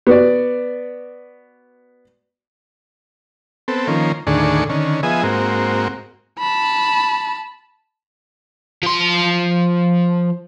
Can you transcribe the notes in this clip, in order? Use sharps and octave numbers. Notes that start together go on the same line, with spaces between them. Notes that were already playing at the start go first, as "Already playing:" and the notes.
B3 F#4 D5
B3 C4 A4
D#3 F3 A#3 C#4
D#2 A2 D3 D4 G#4 C#6
D3 D#3 C#4
F3 B3 G#4 D#5 E5 G#5
G#2 A#3 C4 F#4
A5 B5
F3 C6